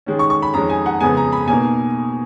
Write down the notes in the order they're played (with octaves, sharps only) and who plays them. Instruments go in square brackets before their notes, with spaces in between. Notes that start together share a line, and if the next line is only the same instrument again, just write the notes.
[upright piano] D#3 G#3 C#4
C#6
C#6
B5
F2 D#3 G#3 C#4 A#5
G#5
F#5
F2 C#3 G#3 B3 G#5
A#5
B5
B2 A#3 D#4 G#5